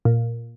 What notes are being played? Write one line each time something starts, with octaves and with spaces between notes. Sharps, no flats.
A#2